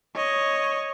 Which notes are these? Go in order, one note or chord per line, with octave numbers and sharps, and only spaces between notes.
C#5 D#5